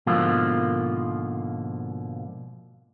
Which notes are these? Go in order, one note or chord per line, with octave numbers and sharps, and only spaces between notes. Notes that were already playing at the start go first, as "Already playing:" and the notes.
G#2 B2 D3 F3 A#3 F4